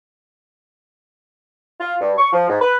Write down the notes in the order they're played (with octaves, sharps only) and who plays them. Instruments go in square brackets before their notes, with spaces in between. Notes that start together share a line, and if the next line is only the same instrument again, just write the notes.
[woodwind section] F4
G2
C#6
F3
G#2
B4